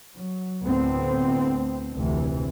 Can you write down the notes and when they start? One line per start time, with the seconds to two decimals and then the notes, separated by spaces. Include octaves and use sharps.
0.14 F#3
0.64 D2 A2 B3 C4
1.93 F1 D2 C3 E3